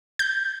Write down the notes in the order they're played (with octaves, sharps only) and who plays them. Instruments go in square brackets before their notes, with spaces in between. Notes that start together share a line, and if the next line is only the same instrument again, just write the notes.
[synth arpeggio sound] G6